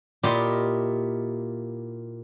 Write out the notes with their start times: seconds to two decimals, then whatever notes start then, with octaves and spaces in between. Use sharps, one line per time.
0.23 A#2 E4 F4 G4 D#5